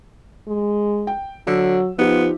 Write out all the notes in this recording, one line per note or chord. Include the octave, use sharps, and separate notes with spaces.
G#3
G5
D3 F#3 E6
F3 B3 D#4 F4 G4